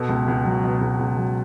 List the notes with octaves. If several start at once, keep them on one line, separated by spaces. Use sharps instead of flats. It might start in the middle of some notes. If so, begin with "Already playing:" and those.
Already playing: B2 A4
C#2
C#2
F#3
B2
C#2
C#2
F#3